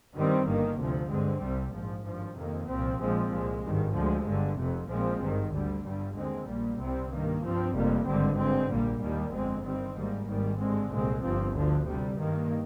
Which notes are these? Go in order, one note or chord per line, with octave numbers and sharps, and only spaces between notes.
G2 D#3 G3 C4
G1 G2 D#3 A#3
D2 C3 F3
G2 D3 G#3 C4
C2 C3 G3
A#1 G#2 F3
G#1 G2 F3
F2 C3 D#3 A#3
C2 A#2 F3 C4
A#1 A#2 F3 G#3 C4
C2 A#2 G#3
G#1 G2 D#3
D2 D3 F3 G#3
G1 G2 D3
F1 F2 C3
A#1 A#2 F3 G#3 C4
G#1 G2 D#3
D2 D3 G3
G1 G2 D3 G3
D#2 D3 G#3 C4
A#1 A#2 G3 A#3
C2 C3 G3 C4
G2 D#3 A#3
G2 F3 C4
F1 F2 C3 G3 A#3
G#1 G2 D3 G3 C4
G2 D3 G#3 C4
A#1 A#2 G3 A#3
D#2 D#3 G3 A#3
G1 F2 D3 G#3 C4
G2 D#3 G3 C4
G#1 G#2 G3 A#3
G#1 G#2 D#3 G3
G2 D3 G#3 C4
C2 A#2 G#3 C4
G1 G2 F3 C4
D2 D3 F3
D2 C3 G3
G2 D#3 A#3